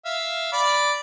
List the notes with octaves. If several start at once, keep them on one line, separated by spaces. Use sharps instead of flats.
E5 F5
D5 B5